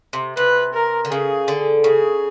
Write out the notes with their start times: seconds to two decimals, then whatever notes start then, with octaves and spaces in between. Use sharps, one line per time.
0.13 C3
0.37 C3 B4
0.74 A#4
1.05 D3
1.11 C#3 G#4
1.48 D3
1.84 C#3 G#4